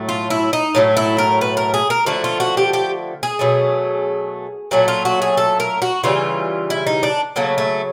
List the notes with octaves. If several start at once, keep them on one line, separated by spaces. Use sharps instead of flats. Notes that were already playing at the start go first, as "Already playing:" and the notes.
Already playing: A2 F#3 A3
F4
E4
D#4
A2 F#3 A3
E4
A#4
B4
A#4
G#4
A#4
D3 F3 A3 F#4
F4
F#4
G4
G4
G#4
B2 F#3 A3
A#2 F#3 A3 F#4
F4
F#4
G#4
A4
A#4
F#4
C#3 E3 G3 F4
E4
D#4
D4
C#3 F#3 A3 A#3
A3